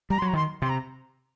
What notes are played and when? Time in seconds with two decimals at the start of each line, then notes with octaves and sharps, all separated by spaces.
0.10 G3 A#5
0.19 C6
0.22 F#3
0.28 A#5
0.33 D#3 C6
0.62 C3 C6
0.69 A#5